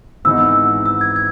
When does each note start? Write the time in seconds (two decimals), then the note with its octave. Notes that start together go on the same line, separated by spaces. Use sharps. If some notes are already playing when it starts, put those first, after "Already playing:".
0.25 G#1 G#2 E3 B3 D#4 E6
0.86 E6
1.01 G#6
1.16 G#6